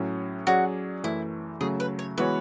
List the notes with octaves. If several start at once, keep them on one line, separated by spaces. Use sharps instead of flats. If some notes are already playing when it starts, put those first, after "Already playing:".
Already playing: A2 F#3 C#4
F#3 C#4 F#4 G#4 D5
F#2 E3 A3 E4
C#3 F#3 A3 G#4
B4
C#5
E3 G#3 B3 F#4 B4 C#5